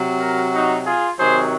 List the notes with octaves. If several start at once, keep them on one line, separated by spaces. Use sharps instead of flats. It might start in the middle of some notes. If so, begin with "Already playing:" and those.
Already playing: C3 F#3
F#4 A#4
D#4 F#4
F4 G#4
C3 D#3 F#3 G#4 C5